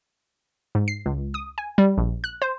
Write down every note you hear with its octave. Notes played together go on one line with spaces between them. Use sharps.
G#2
C7
C#2
D#6
G#5
G3
A#1
F#6
C5